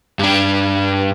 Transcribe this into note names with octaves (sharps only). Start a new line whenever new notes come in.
G2 D4